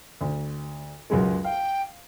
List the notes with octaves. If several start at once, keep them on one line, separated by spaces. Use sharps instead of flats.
D2
C#2 F#2 G#3
F5 G5